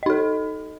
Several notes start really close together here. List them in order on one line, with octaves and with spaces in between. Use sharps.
D#5 D#4 A4